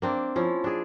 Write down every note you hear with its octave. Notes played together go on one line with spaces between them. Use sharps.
A#3 C4 D4
F3 C#4 E4
D4 G#4